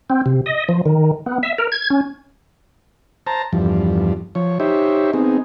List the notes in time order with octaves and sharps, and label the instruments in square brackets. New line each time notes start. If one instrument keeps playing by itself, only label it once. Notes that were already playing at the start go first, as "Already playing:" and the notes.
[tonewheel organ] C4
C3
D#5
F3
D#3
B3
E5
A#4
G#6
C#4
[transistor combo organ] C5 A5 A#5
E2 G2 F3
F3 C#5
D#4 G4 C5 C#5 E5
B3 C4 D#4 G#4